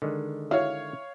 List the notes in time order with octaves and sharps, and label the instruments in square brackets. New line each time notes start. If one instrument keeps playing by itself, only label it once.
[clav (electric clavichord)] D3 D#3 G#3
[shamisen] E4 F#4 [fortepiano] C#5 F5